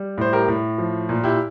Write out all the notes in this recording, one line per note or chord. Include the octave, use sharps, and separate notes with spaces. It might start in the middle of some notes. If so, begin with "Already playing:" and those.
Already playing: G3
A2 C5
G4 A#4
A2
F3
A#2
E4 G4